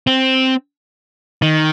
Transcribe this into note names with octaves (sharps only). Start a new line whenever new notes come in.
C4
D#3